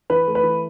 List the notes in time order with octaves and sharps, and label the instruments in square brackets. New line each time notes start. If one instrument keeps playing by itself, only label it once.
[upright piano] E3 B4
A3
B4
E3